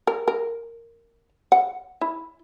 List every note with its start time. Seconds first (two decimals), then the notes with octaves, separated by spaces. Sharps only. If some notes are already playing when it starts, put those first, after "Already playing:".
0.07 A#4
0.28 A#4
1.52 F#5
2.01 E4